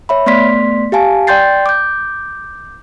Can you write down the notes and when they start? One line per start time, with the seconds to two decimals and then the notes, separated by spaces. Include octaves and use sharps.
0.09 C#5 E5 B5
0.26 A3 B3 D5 C6 B6
0.92 G4 F5 G#5 A5
1.27 D5 G5 C6 G6 A6 C7
1.66 D6 G6